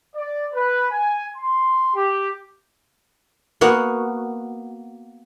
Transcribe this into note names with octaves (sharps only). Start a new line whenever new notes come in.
D5
B4
G#5
C6
G4
A#3 B3 F#4